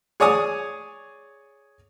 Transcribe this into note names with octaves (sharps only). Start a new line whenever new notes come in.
G#4 C#5 D5 G#5 D#6